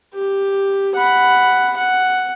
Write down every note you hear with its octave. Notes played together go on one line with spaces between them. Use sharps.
G4
F#5 B5
F#5